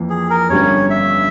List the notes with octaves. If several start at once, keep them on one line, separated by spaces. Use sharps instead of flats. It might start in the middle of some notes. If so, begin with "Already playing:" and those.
Already playing: F2 E3 A#3
G#4
A#4
G1 G2 G3 C#4 C#5
E5